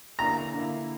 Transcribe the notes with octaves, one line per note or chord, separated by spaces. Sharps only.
D3 A#3 E4 A#5
D3 A#3 E4